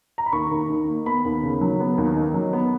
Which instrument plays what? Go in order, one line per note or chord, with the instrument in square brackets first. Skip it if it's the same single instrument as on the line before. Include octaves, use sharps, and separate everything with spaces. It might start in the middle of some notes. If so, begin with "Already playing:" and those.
[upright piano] A#5
B5
D#2 C#6
D#2
D#3
A#3
B3 B5
D#2
C#3
F#3
B3
D#2
D#3
F#3
B3